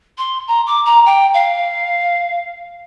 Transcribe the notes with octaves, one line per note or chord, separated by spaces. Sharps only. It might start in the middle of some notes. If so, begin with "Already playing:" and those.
C6
A#5
D6
A#5
G5
F5